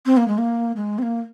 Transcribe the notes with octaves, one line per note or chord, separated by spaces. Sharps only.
C4
A#3
G#3
A#3
G#3
C4
A#3